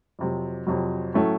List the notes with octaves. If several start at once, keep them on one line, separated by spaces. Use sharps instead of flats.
F2 C3 F#3
F2 C3 F#3
A2 F#3 A3 C#4